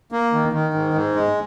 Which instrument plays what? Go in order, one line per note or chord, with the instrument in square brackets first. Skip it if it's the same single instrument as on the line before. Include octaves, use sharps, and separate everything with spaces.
[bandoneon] A#3
D#3
D#3
G#2
G#2
G#3